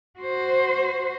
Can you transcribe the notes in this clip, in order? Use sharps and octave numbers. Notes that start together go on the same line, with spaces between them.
F#4 C5